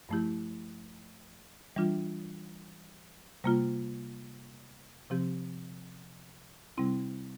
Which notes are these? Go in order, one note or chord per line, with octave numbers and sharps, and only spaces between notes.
G2 F3 A3 E4 G4
E3 G3 D4 F4
C3 G3 A#3 F4
C3 F3 C4 G4
C3 G3 C4 E4